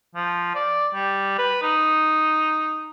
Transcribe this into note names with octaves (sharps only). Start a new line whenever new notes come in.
F3
D5
G3
B4
D#4